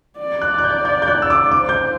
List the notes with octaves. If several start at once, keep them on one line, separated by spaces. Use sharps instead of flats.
D5
F#6
F#6
G6
G6
G6
F#6
E6
D6
C5 D6
G6